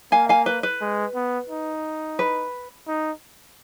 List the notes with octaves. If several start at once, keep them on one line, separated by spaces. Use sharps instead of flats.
A#3 F5 G#5
F5 G#5
B4
B4
G#3
B3
D#4
B4
D#4